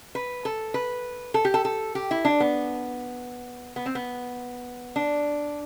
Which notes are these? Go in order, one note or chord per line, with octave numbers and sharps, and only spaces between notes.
B4
A4
B4
A4
G4
A4
A4
G4
E4
D4
B3
B3
C4
B3
D4